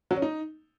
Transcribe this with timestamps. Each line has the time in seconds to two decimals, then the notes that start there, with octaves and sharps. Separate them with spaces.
0.11 F#3
0.16 C#4
0.22 D#4